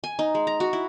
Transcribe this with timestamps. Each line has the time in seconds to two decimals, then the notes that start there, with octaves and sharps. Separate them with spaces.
0.04 G#5
0.19 D#4
0.35 G#3
0.47 A#5
0.60 F#4
0.73 E4